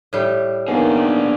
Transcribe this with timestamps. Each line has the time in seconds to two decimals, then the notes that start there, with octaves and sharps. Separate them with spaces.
0.13 A2 G3
0.68 D#3 A#3 B3 D4 G#4